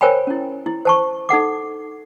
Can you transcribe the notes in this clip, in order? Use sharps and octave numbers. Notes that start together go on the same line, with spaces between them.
A#4 C5 C#5 G5 G#5 B5
C#4 E4
E4
C5 A5 C#6
D#4 A4 F#5 D6